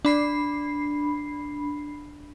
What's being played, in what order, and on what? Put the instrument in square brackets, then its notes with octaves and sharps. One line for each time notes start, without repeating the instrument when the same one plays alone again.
[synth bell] D4 B5 C7